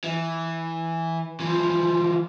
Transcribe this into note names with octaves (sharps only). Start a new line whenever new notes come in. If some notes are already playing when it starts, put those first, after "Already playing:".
E3
E3 F3